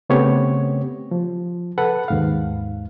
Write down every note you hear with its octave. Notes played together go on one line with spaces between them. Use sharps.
C#3 A3 B3 C4 G4 C#5
F3
A4 B4 F#5
D#2 G#2 F5